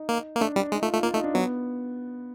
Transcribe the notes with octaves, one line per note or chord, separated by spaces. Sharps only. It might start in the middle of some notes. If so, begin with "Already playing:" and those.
Already playing: D#4
A#3
A#3
A3 D4
G3 D4
G#3 D#4
A3 F4
A3 F4
A#3 F4
A3 D#4
D4
F#3 B3